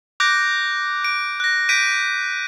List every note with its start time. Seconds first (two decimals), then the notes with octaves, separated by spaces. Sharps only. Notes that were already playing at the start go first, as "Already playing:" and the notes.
0.20 D6 F#6 G6 A#6 D7
1.04 D7
1.40 F#6 A#6
1.69 G6 B6 D7 D#7